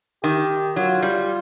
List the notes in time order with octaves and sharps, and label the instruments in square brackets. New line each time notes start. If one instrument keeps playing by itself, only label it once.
[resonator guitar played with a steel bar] D#3 [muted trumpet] G4
[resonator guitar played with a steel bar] F#3 [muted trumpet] F4
[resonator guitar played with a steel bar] G3